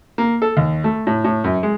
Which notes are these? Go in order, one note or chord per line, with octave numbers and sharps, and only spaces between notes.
A#3
A4
D#2
A3
A2
A2
F#2
G#3